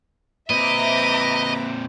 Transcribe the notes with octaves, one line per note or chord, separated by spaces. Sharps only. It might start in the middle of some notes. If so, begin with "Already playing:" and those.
A#2 C4 B4 D#5 E5 A#5 D6